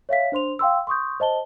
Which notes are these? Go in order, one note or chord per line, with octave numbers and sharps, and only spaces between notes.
C#5 E5 F5 B6
D4 C5 C6 F7
F5 G5 C6 E6
C6 C#6 D#6 G6
C5 D#5 A5 G7